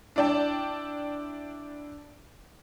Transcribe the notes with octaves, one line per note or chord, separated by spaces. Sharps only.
D4 E4 D5 G5 A5